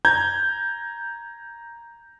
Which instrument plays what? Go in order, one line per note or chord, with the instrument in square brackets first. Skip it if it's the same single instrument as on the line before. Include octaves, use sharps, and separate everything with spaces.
[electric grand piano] A#5 G6 G#6